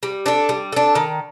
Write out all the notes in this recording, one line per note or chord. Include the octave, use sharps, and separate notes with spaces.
G3
D4 A4
G3
D4 A4
D#3